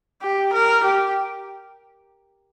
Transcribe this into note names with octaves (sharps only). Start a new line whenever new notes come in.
G4
A#4
G4